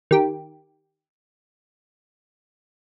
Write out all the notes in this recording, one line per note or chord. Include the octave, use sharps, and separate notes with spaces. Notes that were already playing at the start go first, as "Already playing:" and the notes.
D#3 G4